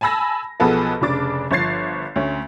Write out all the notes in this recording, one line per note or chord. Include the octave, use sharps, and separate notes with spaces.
G#5 A5 B5 E6 A#6
B1 F3 B3 G#4 A4 B4
F1 C#3 D4 D6 A6
G1 F3 C#5 G#6 A6 C7
D2 A3 C#4